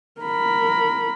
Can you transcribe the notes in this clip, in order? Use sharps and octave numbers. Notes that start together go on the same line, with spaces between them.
A#4 B5